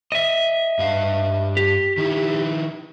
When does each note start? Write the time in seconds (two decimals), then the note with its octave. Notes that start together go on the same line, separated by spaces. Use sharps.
0.12 D#5 E5
0.79 G2 F5
1.57 G4
1.97 D#3 D#4 E4